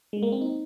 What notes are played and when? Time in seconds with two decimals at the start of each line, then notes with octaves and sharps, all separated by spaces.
0.13 G#3
0.23 A#3
0.32 C4
0.41 D#4